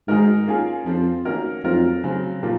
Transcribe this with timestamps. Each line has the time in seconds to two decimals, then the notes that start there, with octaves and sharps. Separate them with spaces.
0.08 G#2 D#3 G#3 D#4 F#4 A#4
0.47 A#3 C#4 F4 G#4
0.86 F2 F3 C4 F4 C5
1.25 D#3 A#3 C#4 F#4 A#4
1.64 F2 F#3 C4 F4 A#4
2.04 C#3 F#3 C4
2.43 A#2 F3 A#3